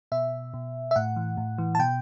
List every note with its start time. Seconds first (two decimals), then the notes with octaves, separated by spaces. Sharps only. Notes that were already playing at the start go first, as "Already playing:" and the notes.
0.12 B2 E5
0.54 B2
0.91 E5
0.96 A2 F#5
1.16 E3
1.37 A2
1.58 E3
1.75 A5
1.79 B2 G5